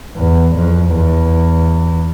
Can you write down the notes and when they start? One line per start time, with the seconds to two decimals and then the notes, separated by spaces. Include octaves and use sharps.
0.16 E2
0.55 F2
0.93 E2